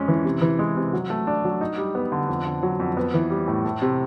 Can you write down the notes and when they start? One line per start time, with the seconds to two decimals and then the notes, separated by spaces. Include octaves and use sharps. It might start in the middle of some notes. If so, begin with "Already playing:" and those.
Already playing: F2 G#3 C#4
0.08 E3
0.25 C3
0.42 E3
0.59 G#3
0.77 C3
0.93 F#3
1.10 A3
1.27 D4
1.45 F#3
1.61 D#4
1.78 G3
1.95 B3
2.12 D3
2.28 F2
2.45 D3
2.63 F#3
2.80 F2
2.97 B3
3.14 E3
3.30 G3
3.48 A2
3.65 A3
3.82 C3